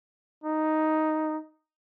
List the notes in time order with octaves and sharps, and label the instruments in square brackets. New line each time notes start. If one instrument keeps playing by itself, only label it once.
[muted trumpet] D#4